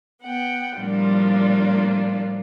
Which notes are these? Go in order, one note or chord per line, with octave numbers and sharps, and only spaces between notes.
B3 F#5 G5
A2 F3 G3 A#3 D4 F4